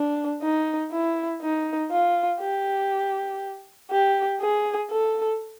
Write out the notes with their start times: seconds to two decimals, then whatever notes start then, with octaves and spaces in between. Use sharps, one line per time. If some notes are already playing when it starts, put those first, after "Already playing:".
Already playing: D4
0.42 D#4
0.91 E4
1.41 D#4
1.91 F4
2.40 G4
3.91 G4
4.41 G#4
4.90 A4